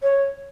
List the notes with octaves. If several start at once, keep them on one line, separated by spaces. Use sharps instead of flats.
C#5